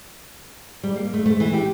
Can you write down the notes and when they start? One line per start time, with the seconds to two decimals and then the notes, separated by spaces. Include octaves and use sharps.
0.83 G3
0.96 A#3
1.14 A3
1.26 A3
1.40 E3
1.54 G4